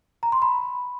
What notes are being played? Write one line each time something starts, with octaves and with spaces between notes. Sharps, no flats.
A#5
C6
B5